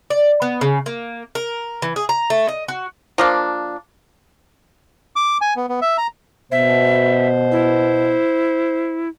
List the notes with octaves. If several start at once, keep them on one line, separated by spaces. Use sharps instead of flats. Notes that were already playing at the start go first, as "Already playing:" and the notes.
D5
B3
C#3
A#3
A#4
E3
G#4
A#5
A3
D#5
F#4
F3 A#3 D4
D6
G#5
B3
B3
E5
A#5
B2 C5 E5
E4